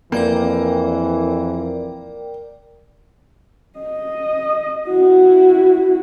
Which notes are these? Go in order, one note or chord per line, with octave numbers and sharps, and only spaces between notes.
F2 E3 A#3 A#4 D5 G5
D#5
E4 F#4